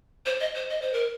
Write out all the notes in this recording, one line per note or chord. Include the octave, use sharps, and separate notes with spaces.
C5
D#5
C5
D#5
C5
A#4